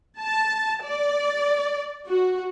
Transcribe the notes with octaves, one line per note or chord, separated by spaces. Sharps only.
A5
D5
F#4